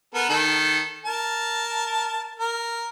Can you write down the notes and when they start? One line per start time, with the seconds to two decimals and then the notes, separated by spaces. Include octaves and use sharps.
0.14 B3 A4 A#4
0.29 D#3 A4
1.05 A#4 A5
2.39 A#4